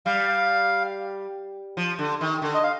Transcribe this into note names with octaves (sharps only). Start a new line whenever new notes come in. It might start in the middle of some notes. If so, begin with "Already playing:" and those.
G3 F5
F3
D3
D#3
D3
D#5
F5